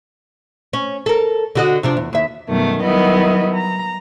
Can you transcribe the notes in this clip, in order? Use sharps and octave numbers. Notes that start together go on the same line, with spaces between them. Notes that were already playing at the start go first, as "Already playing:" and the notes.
C#4
A4 A#4
D3 F#4 D#5
C3 F3 D4
E2
D#2 E5
F#2 B2 D#3 F#3 G3 A3
D#3 F#3 G3 B3 E4 D#5
A#5